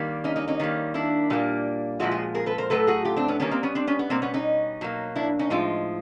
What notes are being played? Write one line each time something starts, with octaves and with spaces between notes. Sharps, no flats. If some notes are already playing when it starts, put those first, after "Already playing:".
Already playing: D#3 G3 A#3
C#4 D#4
C#4 D#4
C#4 D#4
D#3 G3 A#3
D4 E4
A#2 G3 A#3
A#2 F3 G#3 E4 F#4
F#4 G#4
G#4 A#4
A4 B4
A#4 C5
A2 F#3 A3 A4 B4
F#4 G#4
F4 G4
C4 D4
B3 C#4
D#3 G3 A#3 B3 C#4
A#3 C4
B3 C#4
C4 D4
B3 C#4
B3
B2 G3 A#3 C4
B3 C#4
C#4 D#4
B2 F#3 A#3
D4 E4
C#4 D#4
A2 F3 G#3 D#4 F4